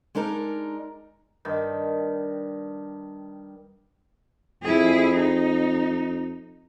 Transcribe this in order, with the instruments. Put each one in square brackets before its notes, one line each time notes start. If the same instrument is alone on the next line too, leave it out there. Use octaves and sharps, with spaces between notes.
[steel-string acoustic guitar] G#3 D4 D#4 A#4
[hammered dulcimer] G2 D#3
[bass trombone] F2 [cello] E4 G#4
[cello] D#4